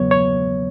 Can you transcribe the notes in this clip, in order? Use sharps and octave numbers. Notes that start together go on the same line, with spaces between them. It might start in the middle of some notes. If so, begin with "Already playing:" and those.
Already playing: E2 C#3 F#3 B3 C#5
C#5